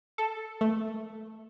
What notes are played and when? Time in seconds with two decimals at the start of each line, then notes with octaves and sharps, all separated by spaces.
0.18 A4
0.61 A3